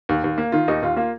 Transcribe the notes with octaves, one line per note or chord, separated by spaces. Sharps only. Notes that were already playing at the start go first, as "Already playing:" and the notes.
D#2
D#2
A#3
D#3 F4
D#2 D#4
D#2 F4
A#3 F4